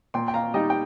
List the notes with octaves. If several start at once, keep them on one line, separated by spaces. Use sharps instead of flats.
A#2 G5 C6
G5
F5 A#5
G3 D#4 D#5 G5
G5